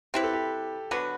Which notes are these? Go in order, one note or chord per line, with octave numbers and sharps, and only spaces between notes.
C4 E4 G4 B4
A4
G4
D3 F#3 B3 F#4 B4